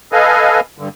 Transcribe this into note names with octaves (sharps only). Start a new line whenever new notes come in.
A4 B4 D#5 F5 G#5
G2 D3